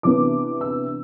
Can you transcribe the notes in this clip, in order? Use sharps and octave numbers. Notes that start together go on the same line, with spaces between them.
C3 E3 B3 D4 D6
E6